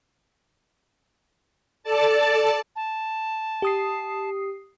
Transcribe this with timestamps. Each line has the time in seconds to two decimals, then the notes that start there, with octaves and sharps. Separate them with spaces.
1.83 A4 D5 A5
2.76 A5
3.62 G4 D#6 C7